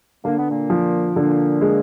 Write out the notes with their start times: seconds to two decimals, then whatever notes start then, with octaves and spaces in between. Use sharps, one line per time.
0.24 D3 A#3
0.37 B3
0.49 A#2 A#3
0.70 F3
1.16 A#2 D3 A#3
1.61 G#3